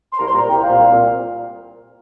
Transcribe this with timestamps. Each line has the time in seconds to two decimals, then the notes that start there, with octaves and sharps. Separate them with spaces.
0.13 C6
0.19 C2 A#4 A#5
0.28 C6
0.34 A#2 G3 C4 A#4 A#5
0.49 C2 G4 G5
0.63 A#2 G3 C4 F4 F5
0.78 C2
0.92 A#2